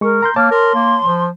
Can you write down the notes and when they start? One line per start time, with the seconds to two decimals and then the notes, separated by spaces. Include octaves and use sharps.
0.01 G#3 A#4 C#6
0.22 A#5 C6 G6
0.36 A#3 C#5 A5 D6 F6
0.51 A#4 C6
0.75 A#3
1.03 F3